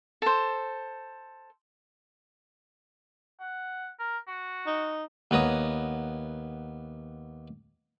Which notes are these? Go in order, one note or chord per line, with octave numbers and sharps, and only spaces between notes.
A4 C5
F#5
A#4
F#4
D#4
D#2 B3 C#5 A#5 D#6